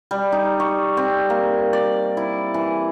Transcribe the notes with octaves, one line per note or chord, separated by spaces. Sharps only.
G3
D#4
C#6
C4
A#3
D5
E4
E3